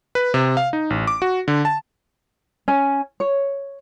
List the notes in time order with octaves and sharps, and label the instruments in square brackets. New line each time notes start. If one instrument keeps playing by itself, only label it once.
[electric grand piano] B4
C3
F5
D#4
A1
D6
F#4
D3
A5
[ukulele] C#4
C#5